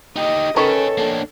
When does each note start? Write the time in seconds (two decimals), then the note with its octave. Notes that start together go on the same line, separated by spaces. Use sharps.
0.16 D#4 G4 D#5
0.57 D#3 C#4 G#4 A4 B4 C#5
0.98 A#3 D4